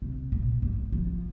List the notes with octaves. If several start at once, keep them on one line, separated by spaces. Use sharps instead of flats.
C3
A#2
G#2
F3